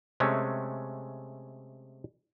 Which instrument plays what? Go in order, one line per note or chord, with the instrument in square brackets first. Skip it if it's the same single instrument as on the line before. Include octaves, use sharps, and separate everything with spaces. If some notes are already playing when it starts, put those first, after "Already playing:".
[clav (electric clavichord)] C3 G#3 A3 C#4